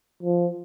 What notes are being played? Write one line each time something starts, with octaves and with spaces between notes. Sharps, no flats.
F3